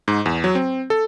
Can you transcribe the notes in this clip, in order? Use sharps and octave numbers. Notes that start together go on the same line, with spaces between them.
G#2
E2
F#3
C4
A4